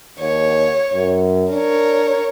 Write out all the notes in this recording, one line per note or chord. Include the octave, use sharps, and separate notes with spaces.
D#2 C#5
F#2
D4 A#4 C#5